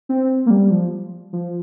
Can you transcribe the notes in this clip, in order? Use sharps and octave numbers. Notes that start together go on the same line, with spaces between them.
C4
A#3
G3
F3
F3